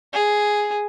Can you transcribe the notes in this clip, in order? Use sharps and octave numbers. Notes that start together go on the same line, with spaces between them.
G#4